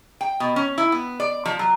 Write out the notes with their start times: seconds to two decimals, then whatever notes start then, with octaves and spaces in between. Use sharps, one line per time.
0.21 G5
0.40 B2
0.56 C#4
0.78 E4
0.92 B3
1.20 D5
1.45 F3
1.59 F#3